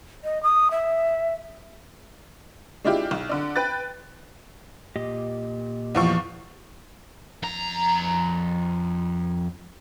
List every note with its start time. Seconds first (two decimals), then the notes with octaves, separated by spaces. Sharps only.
0.24 D#5
0.43 D#6
0.71 E5
2.84 G#3 D4 E4 F4 G4
3.11 B1
3.29 D3 D4
3.56 B4 G5 F#6 A6
4.96 A#2 G4 D#5
5.95 E2 F3 C#6
7.43 F2 A#5